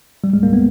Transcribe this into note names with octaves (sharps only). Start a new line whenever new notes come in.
G3
G#3
A#3
B3